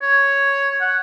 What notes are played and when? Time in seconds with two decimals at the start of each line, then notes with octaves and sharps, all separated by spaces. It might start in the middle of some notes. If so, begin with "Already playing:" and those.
0.02 C#5
0.81 F#5